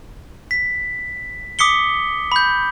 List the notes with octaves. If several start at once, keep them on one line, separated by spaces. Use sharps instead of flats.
B6
D6 D#6 B6 C#7 G7
B5 G6